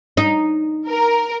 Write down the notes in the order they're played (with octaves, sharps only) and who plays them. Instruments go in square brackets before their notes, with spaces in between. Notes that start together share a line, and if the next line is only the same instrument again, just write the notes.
[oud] D#4
[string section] A#4